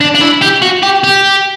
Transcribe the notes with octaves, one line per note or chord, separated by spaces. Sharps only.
D4
D4
E4
G4
F#4
G4
G4